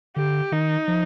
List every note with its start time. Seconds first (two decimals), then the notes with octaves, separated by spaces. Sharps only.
0.16 D3 G4
0.52 D#3 D#4
0.88 F3